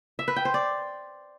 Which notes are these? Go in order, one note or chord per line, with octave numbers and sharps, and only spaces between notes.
E5
B4
G5
C5
D5